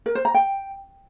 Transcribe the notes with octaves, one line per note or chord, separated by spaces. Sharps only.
A#4
C5
A#5
G5